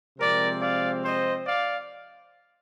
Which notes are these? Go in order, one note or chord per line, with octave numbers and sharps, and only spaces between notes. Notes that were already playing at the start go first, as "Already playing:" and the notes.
C3 F3 G#3 C4 A#4 D5
D5 F5
C5 D#5
D5 F5